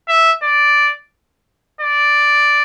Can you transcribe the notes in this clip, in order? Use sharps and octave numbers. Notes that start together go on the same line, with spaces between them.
E5
D5
D5